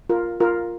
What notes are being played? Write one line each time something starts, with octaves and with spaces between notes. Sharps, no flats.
F4 A#4
F4 A#4